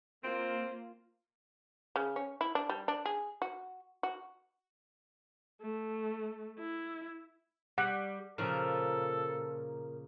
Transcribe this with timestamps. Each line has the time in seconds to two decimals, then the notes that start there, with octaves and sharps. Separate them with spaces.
0.24 A#3 C4 F4
1.96 C#3
2.16 C#4
2.41 E4
2.55 D4
2.69 G3
2.88 D4
3.06 G#4
3.42 F#4
4.03 F#4
5.61 A3
6.59 E4
7.78 G3 F#5
8.38 A#2 C#3 F3 A4 A#4